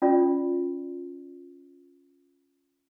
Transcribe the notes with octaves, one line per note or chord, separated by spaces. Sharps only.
C#4 F4 D5